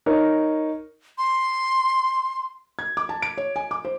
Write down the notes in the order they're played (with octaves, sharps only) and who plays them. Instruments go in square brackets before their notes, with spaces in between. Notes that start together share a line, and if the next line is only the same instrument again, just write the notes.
[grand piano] D#4 A#4 C#5
[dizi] C6
[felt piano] G#6
D6
A5
D7
C#5
G#5
D6
C5